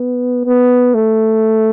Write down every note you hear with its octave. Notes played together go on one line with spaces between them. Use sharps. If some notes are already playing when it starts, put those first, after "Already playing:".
Already playing: B3
B3
A3